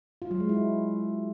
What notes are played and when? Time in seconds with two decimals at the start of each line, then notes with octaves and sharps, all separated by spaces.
0.22 F4
0.31 F#3
0.40 G#3
0.49 E4